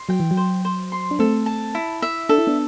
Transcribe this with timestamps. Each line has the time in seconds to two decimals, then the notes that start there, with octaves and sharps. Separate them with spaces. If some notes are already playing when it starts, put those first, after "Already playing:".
Already playing: C6
0.09 F#3 G5
0.20 E3
0.31 F#3
0.37 C5
0.65 C5
0.92 C6
1.11 D4
1.19 A3 C4 A4
1.46 A5
1.75 E4
2.02 E5
2.29 D4 A4
2.38 E4
2.47 B3 D4